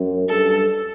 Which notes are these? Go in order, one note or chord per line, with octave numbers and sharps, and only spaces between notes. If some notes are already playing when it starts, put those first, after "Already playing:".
Already playing: F#2
G2 A4